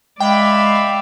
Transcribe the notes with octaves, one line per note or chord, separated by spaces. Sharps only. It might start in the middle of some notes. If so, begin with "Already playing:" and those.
G#3 D5 E5 F5 G5 B5